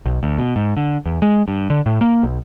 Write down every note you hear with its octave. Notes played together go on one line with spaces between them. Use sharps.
B1
D2
B2
G#2
D3
E2
G#3
G2
D3
A2
A#3
B1